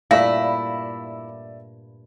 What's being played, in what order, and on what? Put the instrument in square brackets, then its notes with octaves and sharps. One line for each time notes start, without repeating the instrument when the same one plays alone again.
[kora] G2 A#2 A3 [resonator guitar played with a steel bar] E4 [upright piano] D5 E5 A#6 [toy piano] F5